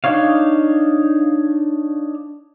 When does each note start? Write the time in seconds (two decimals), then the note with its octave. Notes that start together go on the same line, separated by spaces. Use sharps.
0.04 D4 D#4 C#5 F5